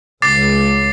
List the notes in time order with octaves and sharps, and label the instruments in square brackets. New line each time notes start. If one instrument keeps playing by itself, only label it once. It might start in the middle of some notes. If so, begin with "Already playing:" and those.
[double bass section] C#2 [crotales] D6 A6 C7